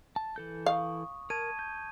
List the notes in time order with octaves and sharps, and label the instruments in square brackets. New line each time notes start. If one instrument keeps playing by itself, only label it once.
[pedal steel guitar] A5
E3 A4 G6
[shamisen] F5 [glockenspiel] C#6 D#6
[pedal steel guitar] A#4 [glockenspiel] A5 G#6 D#7
[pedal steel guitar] G6